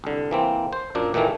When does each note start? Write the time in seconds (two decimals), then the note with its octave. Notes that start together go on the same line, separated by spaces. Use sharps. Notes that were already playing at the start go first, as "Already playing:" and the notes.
0.04 C2 D3
0.31 E3 A#3 C4
0.73 C5
0.95 F#2 A#2 A#3 D4
1.14 A#2 D#3 E3 A3 A#3